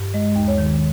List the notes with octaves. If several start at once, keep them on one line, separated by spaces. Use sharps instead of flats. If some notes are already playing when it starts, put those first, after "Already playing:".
Already playing: G2
G#3 D#5
D#2
C#5
D#3